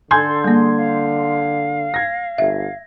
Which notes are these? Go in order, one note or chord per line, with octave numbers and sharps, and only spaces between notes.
D3 A4 G#5 C6 G6 G#6
G3 A#3 G#4
F5
G#6 A#6
G1 E5